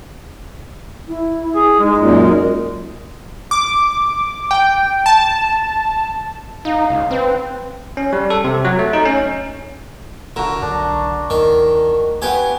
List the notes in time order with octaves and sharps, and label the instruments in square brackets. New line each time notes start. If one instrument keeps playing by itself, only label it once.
[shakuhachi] E4
[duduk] G#4
[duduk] G#3 [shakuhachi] D#4
[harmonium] F#2 A#2
[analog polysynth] D6
G5
A5
[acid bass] D#4 [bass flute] F5
[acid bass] C#2
[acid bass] C4 [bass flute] B4
[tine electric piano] C#4
G3
A4
C3
F#3
A3
D#4
C#4
[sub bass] D#1 [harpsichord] D3 [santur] F#4 A#4
[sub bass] B1 [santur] D4
[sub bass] D2 [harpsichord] D#3
[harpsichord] B3 G4 [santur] F#5 G#5